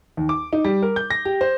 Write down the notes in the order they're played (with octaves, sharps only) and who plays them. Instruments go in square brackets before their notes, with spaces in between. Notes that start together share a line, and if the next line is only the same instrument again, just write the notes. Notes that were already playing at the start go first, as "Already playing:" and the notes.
[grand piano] D#2
D6
D#4
G3
A#4
G6
A#6
G4
C5